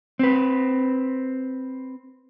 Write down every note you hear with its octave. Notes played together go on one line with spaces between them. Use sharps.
C4 B4